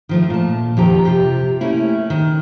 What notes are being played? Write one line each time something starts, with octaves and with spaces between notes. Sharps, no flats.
D#3 F3 A3
A#2 A5
F2 D#3 F3 G4 A#5
C3 F4 G4
A3 A#3 C#4 E4
D#3